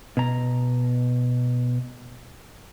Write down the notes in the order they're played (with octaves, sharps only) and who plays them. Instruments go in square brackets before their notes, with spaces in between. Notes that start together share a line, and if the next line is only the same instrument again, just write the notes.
[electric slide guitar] B2 A#5